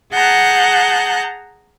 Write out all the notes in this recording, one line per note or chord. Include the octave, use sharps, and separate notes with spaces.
G#4 F#5 A5 A#5 F#6 G6